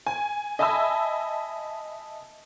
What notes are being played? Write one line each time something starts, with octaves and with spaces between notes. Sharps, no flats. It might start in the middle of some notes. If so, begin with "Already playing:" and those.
G#5
D#5 E5 G#5 A5 B5 E6